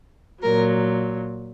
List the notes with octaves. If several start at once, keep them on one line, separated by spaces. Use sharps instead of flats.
A#2 F#3 A#4